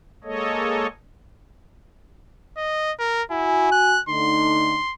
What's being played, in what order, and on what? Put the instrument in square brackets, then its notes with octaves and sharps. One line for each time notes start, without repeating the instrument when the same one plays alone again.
[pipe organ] G#3 A#3 A4 C#5 D#5
[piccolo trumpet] D#5
A#4
[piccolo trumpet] E4 [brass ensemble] F#4 G#5
[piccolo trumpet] F#6
[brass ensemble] D3 A3 D#4 [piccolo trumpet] C6